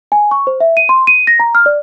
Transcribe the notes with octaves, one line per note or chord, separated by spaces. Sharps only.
G#5
C#6
C5
E5
D#7
C6
D#7
A#6
A#5
F6
D5